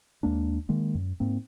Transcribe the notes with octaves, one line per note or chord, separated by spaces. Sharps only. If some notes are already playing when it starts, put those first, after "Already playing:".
D#2 G#3 A#3 D4
D#3 G#3 A#3
F#2
G#2 A#3 C4